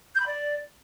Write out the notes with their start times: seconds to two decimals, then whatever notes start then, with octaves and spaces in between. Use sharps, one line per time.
0.15 G6
0.20 B5
0.26 D5